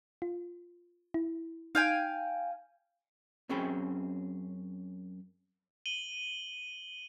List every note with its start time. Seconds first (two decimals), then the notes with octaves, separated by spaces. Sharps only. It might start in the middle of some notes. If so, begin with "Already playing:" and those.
0.22 F4
1.14 E4
1.75 D#4 F5 G5 G#5
3.49 F#2 C4 C#4 G#4 G5 B5
5.86 D#7 F#7 G7